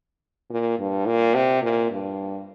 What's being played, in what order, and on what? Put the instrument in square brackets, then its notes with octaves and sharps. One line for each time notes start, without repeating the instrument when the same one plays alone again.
[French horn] A#2
G2
A#2
C3
A#2
G2